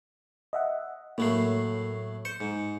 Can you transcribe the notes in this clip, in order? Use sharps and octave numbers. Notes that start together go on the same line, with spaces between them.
D#5 E5 F#5
A2 F#3 A3 A#3 C7
C5 C#7
G#2